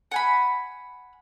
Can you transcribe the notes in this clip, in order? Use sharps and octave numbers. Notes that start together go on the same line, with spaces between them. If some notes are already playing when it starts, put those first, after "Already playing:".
F#5 G#5 B5